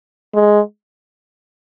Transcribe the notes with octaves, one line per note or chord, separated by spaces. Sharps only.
G#3